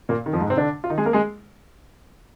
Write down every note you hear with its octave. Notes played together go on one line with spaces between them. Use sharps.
A#2 A#3
D#3
F2 F3
G#2 G#3
C3 C4
D3 D4
F4
D#3 D#4
G#3 G#4
A#3 A#4
G#3 G#4